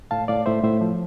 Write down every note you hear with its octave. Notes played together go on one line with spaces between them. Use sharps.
A2 F5 A5
A2 D5 F5
A2 C5 E5
A2 C5 E5
F3